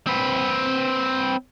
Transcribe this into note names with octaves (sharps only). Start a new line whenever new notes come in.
C4 B4